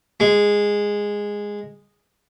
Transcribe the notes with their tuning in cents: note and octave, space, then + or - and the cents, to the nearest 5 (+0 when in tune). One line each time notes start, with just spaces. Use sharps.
G#3 -10